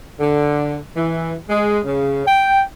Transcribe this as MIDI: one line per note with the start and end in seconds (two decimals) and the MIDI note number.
0.20 0.77 50
0.97 1.35 52
1.50 1.80 56
1.85 2.27 49
2.27 2.63 79